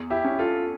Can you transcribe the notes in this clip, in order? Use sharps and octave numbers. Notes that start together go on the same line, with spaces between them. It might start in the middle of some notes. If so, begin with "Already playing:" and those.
Already playing: E2
E4 G4
C#4
F4 A4